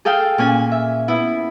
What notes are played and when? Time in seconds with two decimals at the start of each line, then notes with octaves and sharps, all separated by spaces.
0.05 G#4 A4 F5 G5
0.38 A#2 C#4 G#5
0.72 E5
1.08 B3 E4